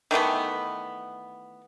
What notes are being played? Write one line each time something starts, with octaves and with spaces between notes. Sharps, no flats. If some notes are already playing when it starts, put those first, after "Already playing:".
D#3 E3 A3 B3